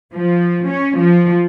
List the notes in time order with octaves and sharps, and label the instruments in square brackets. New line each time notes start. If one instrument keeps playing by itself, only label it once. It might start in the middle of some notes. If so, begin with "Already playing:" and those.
[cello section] F3
C#4
F3